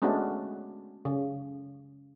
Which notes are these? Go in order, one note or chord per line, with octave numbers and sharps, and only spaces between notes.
G#3 A3 B3 C#4 D4 F#4
C#3